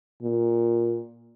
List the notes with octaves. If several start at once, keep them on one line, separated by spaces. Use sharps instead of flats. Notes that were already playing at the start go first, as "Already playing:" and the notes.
A#2